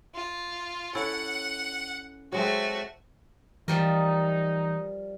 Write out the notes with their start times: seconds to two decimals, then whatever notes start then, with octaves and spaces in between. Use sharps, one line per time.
0.15 F4
0.95 C#4 E4 A4 F#5
2.32 F#3 G#3 A3 C4 F#4
3.68 E3 F3 G3 D#4 A#4